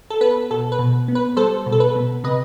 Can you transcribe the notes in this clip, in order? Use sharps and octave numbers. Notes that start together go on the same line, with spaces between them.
A4
B3 B4
B2 A4
B4
B2
B3
B4
G3 A4 C5
B2
A4
B4
B2
C3 B4 D#5